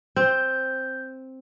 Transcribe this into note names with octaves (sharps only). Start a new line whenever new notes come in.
C4 G6